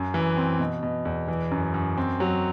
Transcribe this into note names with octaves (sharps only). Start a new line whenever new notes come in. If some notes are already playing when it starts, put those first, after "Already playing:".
Already playing: F#2
E3
C4
B2
B2
E2
E3
F#2
F#2
C4
F#3